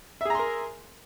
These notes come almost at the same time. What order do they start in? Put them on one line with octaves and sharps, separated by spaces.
E5 G#4 A#5 C6 A#4